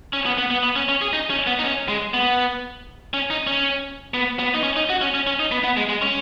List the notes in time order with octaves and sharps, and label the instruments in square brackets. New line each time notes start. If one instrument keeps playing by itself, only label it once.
[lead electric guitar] C#4
B3
B3
B3
B3
C#4
C#4
G#4
D#4
C#4
B3
D#4
C#4
G#3
B3
C#4
D#4
C#4
B3
B3
D#4
C#4
D#4
F#4
C#4
C#4
C#4
D#4
B3
B3
G#3
G#3
C#4